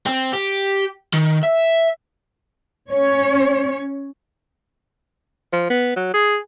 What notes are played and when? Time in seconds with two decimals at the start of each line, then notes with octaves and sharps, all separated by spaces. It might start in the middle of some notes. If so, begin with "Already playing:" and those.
0.07 C4
0.33 G4
1.14 D#3
1.44 E5
2.91 C#4 C#5
5.53 F3
5.70 B3
5.96 F#3
6.14 G#4